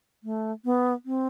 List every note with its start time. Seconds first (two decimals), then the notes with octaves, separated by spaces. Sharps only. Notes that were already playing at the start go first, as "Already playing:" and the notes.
0.24 A3
0.65 B3
1.06 C4